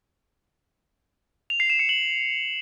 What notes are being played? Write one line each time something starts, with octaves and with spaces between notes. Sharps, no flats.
F7
C7
E7
C#7
F#7